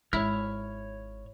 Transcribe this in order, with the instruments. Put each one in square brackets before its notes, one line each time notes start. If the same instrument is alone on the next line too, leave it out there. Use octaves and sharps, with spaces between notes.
[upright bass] G#1 [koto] E4 [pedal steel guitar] C#5 F6